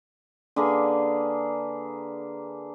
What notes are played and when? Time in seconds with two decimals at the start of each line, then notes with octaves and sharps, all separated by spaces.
0.56 D3 A#3 G#4 B4